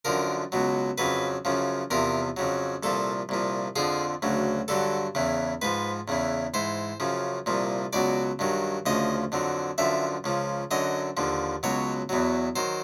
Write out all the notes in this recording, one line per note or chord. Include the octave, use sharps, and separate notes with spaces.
F#2 D3 F3 A#4
C#2 B2 F#3
F2 C#3 F#3 B4
F#2 C#3 F3
E2 C3 F3 A#4
F2 C#3 F#3
C2 A#2 F3 A4
C2 A#2 F3
F2 D3 F3 G#4
D2 C#3 F#3
G2 D3 F#3 A4
E2 C#3 E3
G#2 F3 B4
E2 C#3 E3
G#2 E3 C5
F#2 C#3 F3
C2 A#2 F3
C#2 B2 F#3 D5
G2 D#3 F#3
D2 C#3 F3 D#5
F2 D3 F#3
F#2 D3 F3 E5
C#2 C#3 F3
F#2 D3 F#3 D#5
D#2 D3 F3
C#2 B2 F#3 C#5
E2 B2 F#3
D#3 F#3 C5